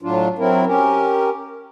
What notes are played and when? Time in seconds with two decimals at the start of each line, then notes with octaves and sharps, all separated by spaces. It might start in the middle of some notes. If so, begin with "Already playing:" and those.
0.02 A2 F#3 D4 F4
0.38 F#3 C4 E4 A#4
0.67 C#4 G4 A#4